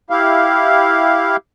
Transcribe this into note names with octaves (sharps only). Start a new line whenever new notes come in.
E4 G4 F5